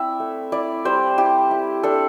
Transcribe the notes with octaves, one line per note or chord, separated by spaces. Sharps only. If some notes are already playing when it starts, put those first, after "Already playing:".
Already playing: C4 E4 D5 E5
A3
E4 D5
G3 C5
E4 G4
E4
D4 A4